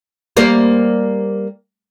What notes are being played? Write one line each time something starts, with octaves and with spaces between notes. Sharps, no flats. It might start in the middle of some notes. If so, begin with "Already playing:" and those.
G3 A#3 C5